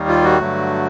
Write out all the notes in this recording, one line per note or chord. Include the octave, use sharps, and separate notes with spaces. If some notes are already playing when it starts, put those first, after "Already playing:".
Already playing: D#2 D#3 G3 A#3
F4
F#4
G2 D3 F#3 A3